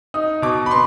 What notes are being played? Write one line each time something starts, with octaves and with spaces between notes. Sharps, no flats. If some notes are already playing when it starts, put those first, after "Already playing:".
D#4 D#6
B2 D6
B5
B3 C6